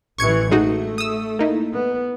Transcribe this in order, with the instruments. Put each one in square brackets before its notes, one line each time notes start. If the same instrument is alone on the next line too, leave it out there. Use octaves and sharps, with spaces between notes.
[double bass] A1 E3 [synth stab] C#6 G#6 C#7
[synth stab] G#3 D#4 F#4 [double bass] A3
[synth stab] D#6 E6
A#3 D#4 E4
[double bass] B3